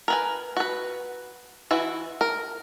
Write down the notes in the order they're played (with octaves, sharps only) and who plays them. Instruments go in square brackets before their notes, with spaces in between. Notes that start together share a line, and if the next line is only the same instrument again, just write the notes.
[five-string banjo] A#4 B4 G#5
F#4 B4
E3 E4 F#4
A#4